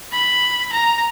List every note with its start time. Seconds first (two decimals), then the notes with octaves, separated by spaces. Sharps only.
0.12 B5
0.73 A#5